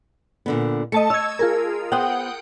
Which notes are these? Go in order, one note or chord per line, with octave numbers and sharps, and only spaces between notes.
A#2 D3 B3
A3 D#5 A5 C#7
C#5 E6 G#6
F4 G#4 A#4
B3 C5 F#5 G5 D#6